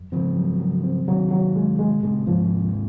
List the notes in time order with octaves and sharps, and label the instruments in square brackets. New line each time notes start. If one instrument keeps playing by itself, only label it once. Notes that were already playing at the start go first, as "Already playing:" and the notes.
Already playing: [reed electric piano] F#2
[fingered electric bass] C#3 F3 [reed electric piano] C4
[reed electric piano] F#3
F#3
C4
[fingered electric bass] C3 D#3 [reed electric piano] F#3
[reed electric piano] F#3
G#3
G#3
[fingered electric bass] A#2 C#3 [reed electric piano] G#3
[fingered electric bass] G#2 C3 [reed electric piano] F3
[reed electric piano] C2